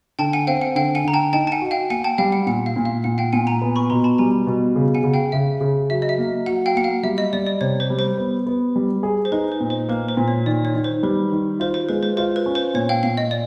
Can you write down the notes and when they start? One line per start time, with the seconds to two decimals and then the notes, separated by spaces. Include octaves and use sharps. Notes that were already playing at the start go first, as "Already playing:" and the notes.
0.19 D3 G5 A5
0.33 F#5 G#5
0.47 C4 F5 G5
0.61 F#5
0.75 D3 F5 G5
0.95 F#5 G#5
1.05 D3 A#5
1.13 G5 A5
1.33 D#4 G5 A5
1.47 A5
1.52 F#5 G#5
1.61 F#4
1.71 F5 G5
1.90 A#3 F#5 G#5
2.04 G5 A5
2.18 G3 F5 G5
2.32 F#5
2.47 A#2 F#5
2.66 F5
2.76 A#2
2.85 F5
3.04 A#2 F#5
3.18 F5 G5
3.33 A#2 F#5 G#5
3.47 G#5 A#5
3.62 B3
3.76 B5 C#6
3.90 B2 A#5 C6
4.04 A5 B5
4.18 G3 G#5 A#5
4.47 B2
4.76 C#3
4.94 F#5 G#5
5.03 C#3
5.14 F5 G5
5.32 C#3 E5
5.61 C#3
5.90 F#3 E5
6.02 D#5
6.09 E5
6.18 A#3
6.46 F#3 F#5
6.66 F5 G5
6.75 A#3 F#5
6.84 F5
7.03 G3 E5
7.18 D#5
7.33 G3 D5
7.47 D5
7.61 C3 C#5
7.80 C5
7.90 G3
7.99 C5
8.18 B3
8.46 B3
8.76 G3
9.03 G#4
9.25 C5
9.32 D#4 B4
9.52 C5
9.60 A#2
9.70 C5
9.89 A#3 B4
10.08 C5
10.17 A#2
10.28 C#5
10.46 D#3 D5
10.65 C#5
10.75 D#3
10.84 C5
11.03 G3 B4
11.32 D#3
11.60 F4 C5
11.74 C5
11.89 G#3 B4
12.03 C5
12.17 F4 C5
12.36 B4
12.46 C#4
12.55 C5
12.74 A#2 C#5
12.89 F5 G5
13.03 A#2 F5
13.17 D#5
13.31 D5